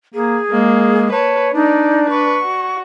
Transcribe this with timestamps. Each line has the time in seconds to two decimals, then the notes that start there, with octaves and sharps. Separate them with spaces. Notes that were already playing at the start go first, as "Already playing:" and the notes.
0.14 A#3 G#4
0.51 G#3 A#3
1.12 B4 C#5 A5
1.54 D4 D#4 D5
2.10 B4 C#6
2.43 F#4